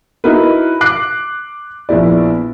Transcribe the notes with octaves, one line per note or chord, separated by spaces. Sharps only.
D#4 E4 F#4 A#4 B4
D6 F#6 C7
A#1 B3 E4 D5